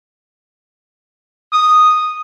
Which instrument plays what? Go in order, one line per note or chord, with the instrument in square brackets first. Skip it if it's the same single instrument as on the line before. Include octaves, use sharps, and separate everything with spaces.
[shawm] D#6